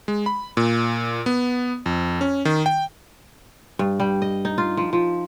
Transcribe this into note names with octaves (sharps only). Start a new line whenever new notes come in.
G#3
B5
A#2
B3
F2
C#4
D#3
G5
G2
G3
D#5
D#4
F4
F3
F3